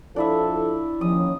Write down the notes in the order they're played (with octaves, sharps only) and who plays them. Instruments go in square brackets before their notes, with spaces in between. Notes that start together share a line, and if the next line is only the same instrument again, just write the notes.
[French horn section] F3 A4 [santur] D4 E4 E5
[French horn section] D#2 C#4 [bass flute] F3 [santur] D#6